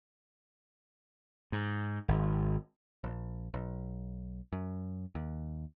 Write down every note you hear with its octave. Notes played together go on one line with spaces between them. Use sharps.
G#2
G#1
A#1
B1
F#2
D#2